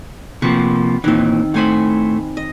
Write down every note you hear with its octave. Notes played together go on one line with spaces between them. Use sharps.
C3 F3 A#3 B4 F#5 C#6
D#2 A#2 D#3 E3 C4
A2 A3 C4 C5 G#5 B5
D#5